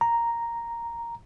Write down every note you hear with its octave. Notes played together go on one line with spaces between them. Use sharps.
A#5